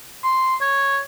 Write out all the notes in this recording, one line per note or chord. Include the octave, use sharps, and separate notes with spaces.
C6
C#5